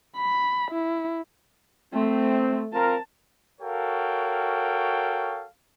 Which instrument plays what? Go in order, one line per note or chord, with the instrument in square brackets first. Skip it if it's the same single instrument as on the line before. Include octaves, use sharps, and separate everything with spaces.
[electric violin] B5
E4
[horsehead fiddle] A3 [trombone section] C4
[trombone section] C4 F4 A#4 [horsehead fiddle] A5
[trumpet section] F#4 A4 A#4 C#5 F5 G5